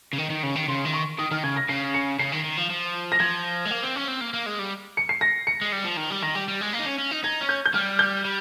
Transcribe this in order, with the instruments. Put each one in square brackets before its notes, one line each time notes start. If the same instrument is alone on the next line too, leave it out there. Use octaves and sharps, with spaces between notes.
[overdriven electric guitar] C#3
D#3
D#3
C#3
D#3
[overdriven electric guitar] C#3 [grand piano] C6
[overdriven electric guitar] D#3
[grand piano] C#6
[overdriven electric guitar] D#3 [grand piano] D#6
[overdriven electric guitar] D#3 [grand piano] F6
[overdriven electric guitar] C#3 [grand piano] G#6
[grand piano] A#6
[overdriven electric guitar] C#3 [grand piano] C7
[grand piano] C#7
[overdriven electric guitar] C#3 [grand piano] C7
[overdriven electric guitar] D#3
D#3
F3
F3
[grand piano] A#6
[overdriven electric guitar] F3 [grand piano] G#6
[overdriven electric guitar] G#3
A#3
C4
C#4
C4
A#3
A#3
G#3
G3
[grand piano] C#7
C7
A#6
C#7
[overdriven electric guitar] G#3
G3
F3
D#3
G3
[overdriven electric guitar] D#3 [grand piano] A#6
[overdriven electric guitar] G3
G3
G#3
A#3
D#4
C#4
C#4
D#4
[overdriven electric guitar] D#4 [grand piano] G#6
[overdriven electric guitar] C#4
[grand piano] G6
G6
[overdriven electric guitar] G3 [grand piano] F6
[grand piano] G6
[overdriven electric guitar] G3